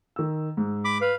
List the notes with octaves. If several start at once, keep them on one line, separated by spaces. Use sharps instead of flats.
D#3 E6
G#2
B5 D6
B4 F5